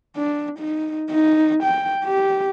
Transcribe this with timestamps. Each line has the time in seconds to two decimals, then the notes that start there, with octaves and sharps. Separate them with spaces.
0.16 D4
0.59 D#4
1.10 D#4
1.63 G5
2.05 G4